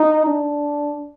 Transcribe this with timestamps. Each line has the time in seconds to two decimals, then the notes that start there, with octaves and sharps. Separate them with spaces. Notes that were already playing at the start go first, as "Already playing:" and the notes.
Already playing: D#4
0.27 D4